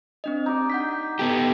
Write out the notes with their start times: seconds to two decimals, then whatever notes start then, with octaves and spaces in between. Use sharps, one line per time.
0.24 C4 D4 D#5
0.46 D#4 G4 D5
0.70 F#5 G6 B6
1.19 B3 G4 A4